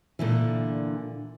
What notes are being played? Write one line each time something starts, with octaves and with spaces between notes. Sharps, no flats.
A#2 D3 E3